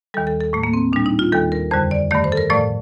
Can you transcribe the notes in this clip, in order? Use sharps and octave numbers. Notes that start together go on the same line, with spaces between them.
D#2 D#3 G3 A4
A4
A4
A2 A3
A#3
C4
A#2 G3 D4
D#4
F4
D#2 D#3 G3 A4
A#4
F2 D3 G3 C5
D5
G2 D#3 A3 D5
C5
A4
A#4
A2 F3 A3 D5